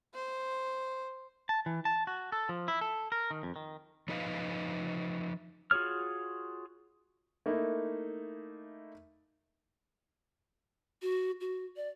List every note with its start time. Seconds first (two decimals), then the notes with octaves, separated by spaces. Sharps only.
0.14 C5
1.49 A5
1.66 E3
1.85 A5
2.07 F#4
2.32 A4
2.49 F3
2.68 E4
2.81 A4
3.12 A#4
3.31 D#3
3.43 F2
3.56 D#3
4.08 F3 D#4 B4 D#5 F5
5.71 F4 F#4 G#4 C#5 F6
7.46 A3 A#3 D#4 E4
11.02 F#4
11.41 F#4
11.76 D5